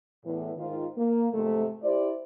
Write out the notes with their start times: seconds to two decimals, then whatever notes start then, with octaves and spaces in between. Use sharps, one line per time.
0.25 E2 A2 E3
0.57 G#2 D#3 F4
0.96 A#3
1.33 F2 G#2 C3 A3
1.83 E4 G4 C5 D5